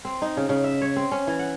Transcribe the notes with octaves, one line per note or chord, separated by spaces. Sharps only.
C4
D#4
C#3
C#3
E5
C#5
C4
C#4
E3
F#5